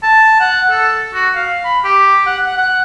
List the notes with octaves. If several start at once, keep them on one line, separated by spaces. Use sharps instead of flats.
A5
F#5
A4
F#4
F5
B5
G4
F#5
F#5
F#5